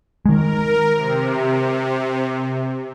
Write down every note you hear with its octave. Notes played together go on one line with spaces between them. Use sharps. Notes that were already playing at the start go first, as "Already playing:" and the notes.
D#3 G#3 A#4
C3